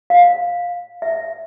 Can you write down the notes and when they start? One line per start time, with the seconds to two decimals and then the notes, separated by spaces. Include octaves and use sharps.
0.10 F5
1.02 E5